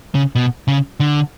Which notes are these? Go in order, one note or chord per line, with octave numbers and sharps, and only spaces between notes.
C#3
B2
C#3
D3